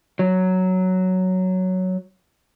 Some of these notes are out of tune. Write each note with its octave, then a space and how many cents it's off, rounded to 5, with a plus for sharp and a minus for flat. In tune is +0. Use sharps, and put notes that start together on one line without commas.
F#3 +5